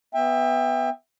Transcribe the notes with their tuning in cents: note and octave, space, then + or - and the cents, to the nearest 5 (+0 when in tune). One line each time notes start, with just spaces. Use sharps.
B3 +0 E5 +0 G5 +30